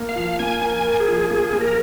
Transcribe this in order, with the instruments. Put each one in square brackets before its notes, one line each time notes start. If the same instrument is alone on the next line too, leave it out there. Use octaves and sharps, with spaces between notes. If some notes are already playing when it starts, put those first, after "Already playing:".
Already playing: [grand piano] A#3
[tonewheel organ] F5
[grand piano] F3
[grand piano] A#3 [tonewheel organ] G#5
[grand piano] A#4
[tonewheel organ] G#5
[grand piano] A#4
[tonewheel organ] G#4
[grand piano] F3
[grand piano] A#3 [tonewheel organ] G#4
[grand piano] A#3
[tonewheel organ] A#4